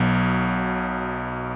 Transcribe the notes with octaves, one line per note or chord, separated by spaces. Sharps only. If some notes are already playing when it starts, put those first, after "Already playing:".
Already playing: B1 B2 F#3